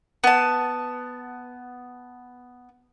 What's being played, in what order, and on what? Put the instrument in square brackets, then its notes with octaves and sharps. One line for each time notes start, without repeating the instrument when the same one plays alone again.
[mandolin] B3 A5